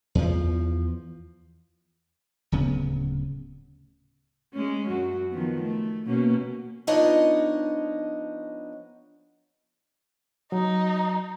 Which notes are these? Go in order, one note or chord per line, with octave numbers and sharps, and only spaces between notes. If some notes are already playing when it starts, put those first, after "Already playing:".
E2 F3
D1 C#3 B3
G#3 C#4
F#2 F#3 F#4
D#3 F3 B3
A3
B2 A#3 C#4
F3 B3 D4 D#4 C#5 D#5
F#3 D#4